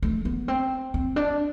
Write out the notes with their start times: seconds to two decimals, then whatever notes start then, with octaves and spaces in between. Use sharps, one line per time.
0.03 A3
0.25 B3
0.48 C4
0.94 C4
1.16 D4